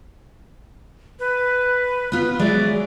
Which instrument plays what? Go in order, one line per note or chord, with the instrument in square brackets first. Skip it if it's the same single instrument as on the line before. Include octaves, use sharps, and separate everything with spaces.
[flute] B4
[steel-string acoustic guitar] B3 F4
[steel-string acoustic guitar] F#3 G#3 D5 [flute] E5